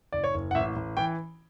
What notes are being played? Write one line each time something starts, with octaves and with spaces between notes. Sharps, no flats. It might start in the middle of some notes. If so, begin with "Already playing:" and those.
F#1 D5
C#5
F#1
F#5
A1 E5
A1
E3 G5